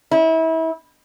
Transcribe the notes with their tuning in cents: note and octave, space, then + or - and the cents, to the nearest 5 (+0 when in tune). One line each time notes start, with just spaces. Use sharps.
E4 -30